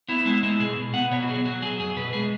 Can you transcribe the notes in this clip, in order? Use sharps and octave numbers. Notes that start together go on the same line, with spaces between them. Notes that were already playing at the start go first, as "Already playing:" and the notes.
B3 E4
G#3 E4
G#3 E4
B2 G#4
B2
B3 F#5
B2 C#5
F#4
F#3 G#4
F#3 F#4
F#3 G#4
F#2 G#4
B2 B4
G#3 G#4